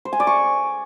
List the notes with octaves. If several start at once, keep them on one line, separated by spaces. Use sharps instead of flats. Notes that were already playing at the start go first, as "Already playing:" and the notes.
C5
G#5
D5
C#6